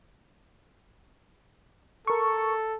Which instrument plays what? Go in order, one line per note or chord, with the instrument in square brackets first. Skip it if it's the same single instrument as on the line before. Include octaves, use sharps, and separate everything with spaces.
[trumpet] A4 [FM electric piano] A#4 C#6